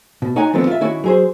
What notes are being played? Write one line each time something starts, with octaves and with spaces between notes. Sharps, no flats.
B2
D#4 C#5 F#5 G#5 A#5
D3 D#3 F3 B3 C4
F4 E5
D#3 C#4 E4 F#4
F#3 G#4 C5